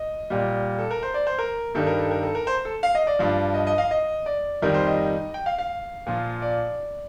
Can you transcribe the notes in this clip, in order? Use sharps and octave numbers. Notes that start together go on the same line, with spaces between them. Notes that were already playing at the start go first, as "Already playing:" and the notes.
Already playing: D#5
A#2 G3
A4
A#4
C5
D5
C5
A#4
G2 D#3 G3 A4
A#4
A4
A#4
A4
A#4
C5
A4
F5
D#5
D5
G2 F3
D#5
D#5
F5
D#5
D5
F2 D#3 G3 A#4
C5
D#5
G5
F5
F5
A#2 F3
D5